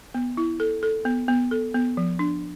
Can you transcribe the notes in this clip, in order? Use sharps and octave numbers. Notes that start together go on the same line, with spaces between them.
B3
E4
A4
A4
B3
B3
A4
B3
F3
D4